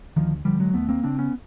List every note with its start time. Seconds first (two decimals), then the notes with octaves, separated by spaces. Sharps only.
0.16 D2 D#3 F3
0.45 D3 F3 G3
0.60 F#3 G#3
0.74 D#2 A3 B3
0.89 A#3 C4
1.03 C#3 C4 D4
1.18 B3 C#4